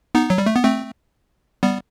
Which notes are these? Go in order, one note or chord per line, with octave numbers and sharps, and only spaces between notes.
B3 D#4
F#3
G3
A3
B3
A3 C4
G3 B3